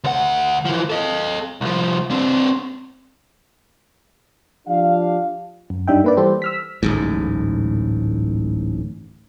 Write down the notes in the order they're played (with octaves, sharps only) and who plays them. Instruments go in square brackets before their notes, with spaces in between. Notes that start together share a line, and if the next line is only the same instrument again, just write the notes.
[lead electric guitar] D2 F#5
E3 F3
A4 D#5
C2 F3
C4 D4
[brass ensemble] F3 D4 G4 F5
[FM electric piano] F#2
G2 G3 D4 D#4 E5 G5
A#3 B4 D5
E3 G3 G4 A4 C5
E6 F6 B6
[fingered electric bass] D1 A1 G#2